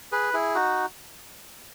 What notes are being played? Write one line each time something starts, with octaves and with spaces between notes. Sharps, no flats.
G#4 B4
E4 G#4
D#4 F#4